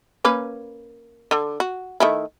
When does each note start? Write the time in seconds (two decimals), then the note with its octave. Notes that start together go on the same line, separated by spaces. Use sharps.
0.25 A#3 C#4 B4
1.31 D3
1.60 F#4
2.00 D#3 A3 E4